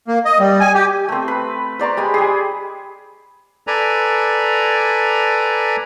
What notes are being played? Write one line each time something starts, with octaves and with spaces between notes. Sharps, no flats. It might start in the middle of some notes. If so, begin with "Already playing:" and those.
A#3
D#5
G3
G#5
G4
A3 C4
B4
C5 D5 A#5 C#6
G#3 G4 G#5 B5
G4 G#4
A4 B4 D5 G#5 A#5